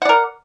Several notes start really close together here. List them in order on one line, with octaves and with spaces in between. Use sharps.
F#5 D5 A#4